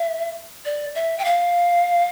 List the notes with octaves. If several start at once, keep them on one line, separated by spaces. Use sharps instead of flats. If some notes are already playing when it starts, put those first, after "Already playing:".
Already playing: E5
D5
E5
G5
F5